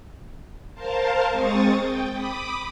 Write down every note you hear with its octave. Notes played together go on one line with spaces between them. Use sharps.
A#4 C5 F5 A5
G#3 C4 C#6 D#6 A6
G5
B5 D6 D#6